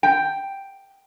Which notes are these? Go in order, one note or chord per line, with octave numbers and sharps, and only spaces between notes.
G5